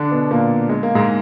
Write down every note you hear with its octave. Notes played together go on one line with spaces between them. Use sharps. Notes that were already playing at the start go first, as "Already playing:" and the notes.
Already playing: D3 D4
B2 B3
A#2 A#3
G#3
A#3
G#2 G#3